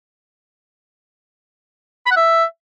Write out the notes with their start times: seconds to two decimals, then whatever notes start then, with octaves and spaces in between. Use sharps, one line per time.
2.06 B5
2.11 F#5
2.16 E5